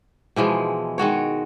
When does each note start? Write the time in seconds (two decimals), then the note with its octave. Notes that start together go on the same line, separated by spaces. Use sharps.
0.36 B2 E3 F3 G#3
0.98 D#3 G#3 F#4 C#5